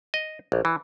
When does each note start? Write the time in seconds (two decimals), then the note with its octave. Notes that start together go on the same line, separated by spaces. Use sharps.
0.14 D#5
0.52 A#1
0.65 E3